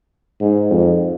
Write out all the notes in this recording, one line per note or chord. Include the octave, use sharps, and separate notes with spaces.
G#2
F2